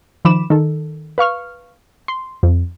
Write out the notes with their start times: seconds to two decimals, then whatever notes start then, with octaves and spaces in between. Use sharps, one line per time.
0.25 D#3 F3 B5 D6 E7
0.50 D#3 A4
1.18 B4 F5 C#6 F6
2.08 C6
2.43 F2